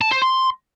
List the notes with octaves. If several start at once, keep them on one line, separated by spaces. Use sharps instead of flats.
A5
C5
C6